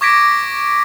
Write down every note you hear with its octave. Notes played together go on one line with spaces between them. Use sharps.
C#6 D6 G#6 A#6 B6 D7